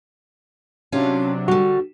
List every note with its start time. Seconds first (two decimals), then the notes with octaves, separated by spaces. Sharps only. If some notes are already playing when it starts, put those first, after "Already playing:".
0.92 C3 F#3 C#4 D4 F4
1.48 D3 G3 F#4